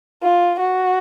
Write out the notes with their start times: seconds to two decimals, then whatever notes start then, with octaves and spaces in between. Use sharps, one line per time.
0.23 F4
0.59 F#4